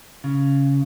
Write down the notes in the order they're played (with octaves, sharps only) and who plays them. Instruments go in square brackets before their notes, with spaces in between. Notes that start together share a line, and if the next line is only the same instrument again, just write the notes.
[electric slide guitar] C#3